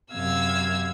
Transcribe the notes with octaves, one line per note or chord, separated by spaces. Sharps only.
F#2 C3 F5 E6 G#6